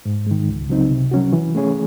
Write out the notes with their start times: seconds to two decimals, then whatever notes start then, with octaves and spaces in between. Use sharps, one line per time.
0.05 G#2
0.27 D#3 G#3
0.49 C#2
0.69 C#3 F#3 C4 D#4
0.90 C3
1.11 F#3 C#4 F#4
1.33 E3
1.55 A3 C#4 G#4 C#5